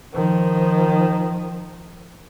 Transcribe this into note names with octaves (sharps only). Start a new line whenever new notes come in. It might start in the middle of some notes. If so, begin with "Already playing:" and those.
D#3 F3